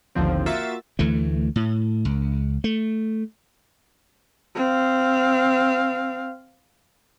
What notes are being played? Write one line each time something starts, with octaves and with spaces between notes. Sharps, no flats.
A1 D#2 D3 F3 C4
A#3 F4 F#4 E5 A6
D2 E3 A3
A2
C#2
A3
C4 F5